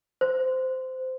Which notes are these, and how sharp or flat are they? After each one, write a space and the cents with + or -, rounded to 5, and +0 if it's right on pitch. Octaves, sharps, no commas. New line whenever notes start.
C5 -15